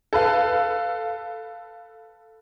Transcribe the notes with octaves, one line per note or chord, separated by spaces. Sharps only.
A4 B4 F5